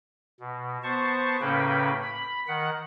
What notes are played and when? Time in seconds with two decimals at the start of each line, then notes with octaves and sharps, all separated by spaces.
0.40 B2
0.83 B3 C5 A5 C#6
1.41 A2 C#3 A#3 C#4 B4 G5
2.01 B5
2.48 D#3 F#5